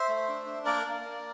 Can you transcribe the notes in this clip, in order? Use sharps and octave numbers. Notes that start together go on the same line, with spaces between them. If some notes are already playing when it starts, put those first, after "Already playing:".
Already playing: C5 E5
A3
D4
D4
A#3 A#4 D5
A#3
A#3